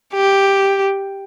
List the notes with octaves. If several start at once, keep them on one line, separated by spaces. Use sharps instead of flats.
G4